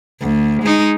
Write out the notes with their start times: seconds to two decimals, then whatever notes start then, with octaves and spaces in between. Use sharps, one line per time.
0.20 D2
0.63 G#3 D#4